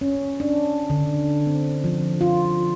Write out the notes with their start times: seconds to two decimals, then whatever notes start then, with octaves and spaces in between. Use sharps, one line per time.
0.01 C#4
0.40 D4
0.90 D3
1.47 C4
1.84 F3
2.21 F4